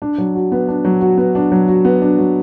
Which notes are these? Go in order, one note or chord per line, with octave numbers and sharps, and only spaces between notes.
D4
F#3
F#4
B3
D4
F#3
F#4
B3
D4
F#3
F#4
B3
D4
F#3